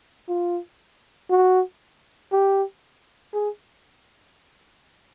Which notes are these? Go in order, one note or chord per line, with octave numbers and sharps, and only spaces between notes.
F4
F#4
G4
G#4